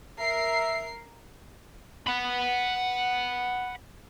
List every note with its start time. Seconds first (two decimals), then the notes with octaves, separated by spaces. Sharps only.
0.20 A#4 E5 C7
2.07 F#5 B5